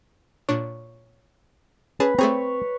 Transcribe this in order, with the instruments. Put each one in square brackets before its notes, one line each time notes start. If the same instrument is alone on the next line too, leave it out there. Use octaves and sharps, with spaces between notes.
[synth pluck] A#2 D4 [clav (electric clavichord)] C#5
[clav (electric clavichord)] C#4 [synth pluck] G#4 A5 [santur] B4
[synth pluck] A3 G#4 A#5 [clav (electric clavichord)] C4 [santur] C#5